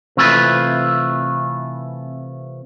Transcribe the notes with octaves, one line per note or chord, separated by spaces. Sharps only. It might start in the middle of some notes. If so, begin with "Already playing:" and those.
C3 E3 A3 E4 F4 B4